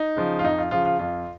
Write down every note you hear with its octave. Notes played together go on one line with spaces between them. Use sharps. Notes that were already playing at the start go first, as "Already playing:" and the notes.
Already playing: D#4
C#3 F3
F4
F2 D#4
F4
C#3 F3 F4
F4
F2 F4